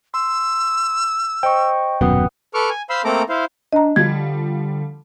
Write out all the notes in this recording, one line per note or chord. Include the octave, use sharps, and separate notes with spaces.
C6 E6
C5 D#5 G5 C#6
D#1 F#2 B2 B4 F#5 D#6
A4 B4 C#6 D6 F6
G#5
C5 F5 B5 C6 E6
A3 A#3 C4 A4 A#5 D6
E4 C5 F5
D4 D#5 A#5
D3 F3 G3 G#6